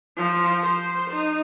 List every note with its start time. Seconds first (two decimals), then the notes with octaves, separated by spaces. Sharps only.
0.17 F3
0.63 C5
1.10 D#4